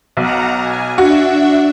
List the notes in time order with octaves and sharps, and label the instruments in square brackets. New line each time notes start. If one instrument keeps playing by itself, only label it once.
[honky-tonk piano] B1 [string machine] F#5 A#5
[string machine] G#5
[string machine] D4 E5 [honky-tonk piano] F#4